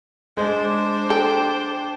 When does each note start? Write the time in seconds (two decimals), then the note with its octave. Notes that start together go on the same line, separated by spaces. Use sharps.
0.37 G#3 D4 C5
1.10 A4 G5